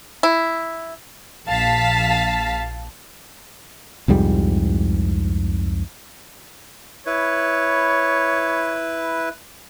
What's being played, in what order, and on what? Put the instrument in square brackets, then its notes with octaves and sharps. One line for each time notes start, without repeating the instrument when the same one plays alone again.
[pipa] E4
[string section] A#1 F5 A5 B6
[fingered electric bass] C2 F2 G#2 G3
[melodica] E4 B4 [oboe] C#5